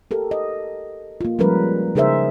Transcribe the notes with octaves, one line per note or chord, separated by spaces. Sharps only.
G4 A4 A#4
D#5
A#3 F4
F3 G3 G#3 C#4 A#4 B4
C#3 D#4 G#4 A#4 C5 E5